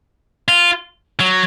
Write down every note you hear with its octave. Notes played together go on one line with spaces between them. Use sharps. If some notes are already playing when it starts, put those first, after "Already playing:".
F4
F#3